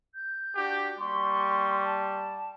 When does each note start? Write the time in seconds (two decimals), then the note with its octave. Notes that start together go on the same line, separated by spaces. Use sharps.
0.15 G6
0.55 D4 F#4 G4
0.99 G3 A#3 C6 C#6
1.85 A5